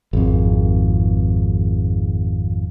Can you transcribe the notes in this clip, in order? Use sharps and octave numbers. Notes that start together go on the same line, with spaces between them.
G#1 F2